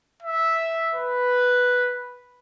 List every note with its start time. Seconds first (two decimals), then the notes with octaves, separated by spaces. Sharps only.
0.22 E5
0.94 B4